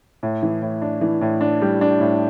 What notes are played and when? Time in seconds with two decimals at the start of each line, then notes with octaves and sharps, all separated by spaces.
0.23 A2
0.43 E3
0.62 A2
0.82 D4
1.01 E3
1.21 A2
1.41 D4
1.62 G3
1.81 D4
2.00 A2